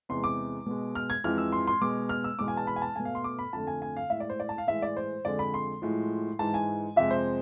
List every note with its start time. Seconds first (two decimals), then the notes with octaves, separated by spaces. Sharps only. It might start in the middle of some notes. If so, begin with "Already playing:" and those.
0.09 E2 C3 G#3 C6
0.24 D6
0.66 B2 G#3
0.95 F6
1.10 G#6
1.24 F2 E3 G#3 F6
1.38 E6
1.52 C6
1.67 C6
1.81 B2 G#3 D6
2.09 F6
2.24 E6
2.39 E2 B2 G#3 D6
2.48 G#5
2.57 A5
2.67 B5
2.76 G#5
2.82 A5
2.96 B2 A3 G#5
3.05 F5
3.15 C6
3.24 D6
3.39 B5
3.53 F2 D3 A3 A5
3.67 G#5
3.82 G#5
3.97 F5
4.10 A2 G#3 E5
4.20 D5
4.30 C5
4.40 D5
4.49 A5
4.58 F5
4.67 A2 E3 G#3 E5
4.82 D5
4.97 C5
5.25 F2 D3 G#3 D5
5.39 B5
5.54 C6
5.82 A2 F3 G#3
6.39 G#2 E3 G#3 A5
6.54 G#5
6.96 F2 C3 G#3 E5
7.11 C5